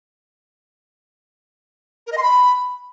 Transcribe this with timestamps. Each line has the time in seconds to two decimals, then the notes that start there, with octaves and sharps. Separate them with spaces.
2.07 A#4
2.12 D#5
2.17 C6
2.23 B5